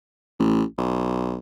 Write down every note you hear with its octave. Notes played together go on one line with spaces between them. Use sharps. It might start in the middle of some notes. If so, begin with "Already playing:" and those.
A1
B1